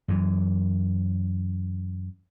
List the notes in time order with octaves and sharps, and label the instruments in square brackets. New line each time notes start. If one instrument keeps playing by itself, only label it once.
[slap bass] F#2 E3